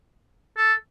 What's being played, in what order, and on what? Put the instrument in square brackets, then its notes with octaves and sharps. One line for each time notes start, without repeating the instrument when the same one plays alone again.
[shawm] A4